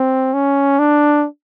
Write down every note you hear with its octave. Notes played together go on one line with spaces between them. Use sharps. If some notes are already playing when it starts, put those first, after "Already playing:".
Already playing: C4
C#4
D4